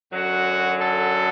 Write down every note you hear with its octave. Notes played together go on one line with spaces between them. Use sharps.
F#2 D3 F#3 F#4
A4